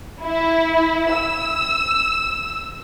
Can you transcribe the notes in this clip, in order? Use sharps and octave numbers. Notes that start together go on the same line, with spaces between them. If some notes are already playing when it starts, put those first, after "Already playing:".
E4
E6